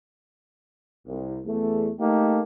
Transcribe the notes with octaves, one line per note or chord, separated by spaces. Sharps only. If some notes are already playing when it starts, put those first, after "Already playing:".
C2
E2 A3
A3 A#3 D#4 G4 A4